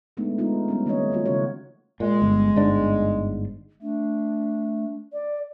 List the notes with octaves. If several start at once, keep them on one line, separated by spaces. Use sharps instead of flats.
G#3 A3 B3 D4 D#4
G#3 B3 D#4 F4
G3 B3 C#4
D#3 A3 A#3 C#4 C#5 D#5
F3 G3 A3 A#3 F4 F#4
C#3 C#4 F#4 C#5
A#2 G#3
G1
G1 G#2 D4
A3 D4
D5